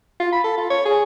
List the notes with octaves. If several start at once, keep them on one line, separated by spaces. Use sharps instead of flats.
F4
B5
A4
F4
C#5
G#4